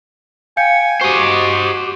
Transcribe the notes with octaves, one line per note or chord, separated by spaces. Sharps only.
F5 G5 G#5 G6 C#7
F#4 G4 C5 D#5 C#6